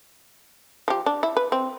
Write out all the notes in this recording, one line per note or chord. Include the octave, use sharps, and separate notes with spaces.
F3 G4
D4
E4
B4
C4